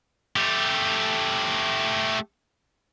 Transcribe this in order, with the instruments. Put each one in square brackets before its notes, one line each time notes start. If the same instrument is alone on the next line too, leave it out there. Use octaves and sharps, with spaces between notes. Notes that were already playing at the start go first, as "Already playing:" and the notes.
[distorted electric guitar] A3 G4